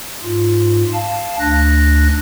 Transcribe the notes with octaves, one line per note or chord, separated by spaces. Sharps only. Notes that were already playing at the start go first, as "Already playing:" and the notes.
G#2 F4
F5 A5
D2 D4 F#6 A#6